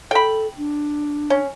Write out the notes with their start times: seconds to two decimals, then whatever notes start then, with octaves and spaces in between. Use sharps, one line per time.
0.11 A4 G5 B5
0.58 D4
1.30 C#4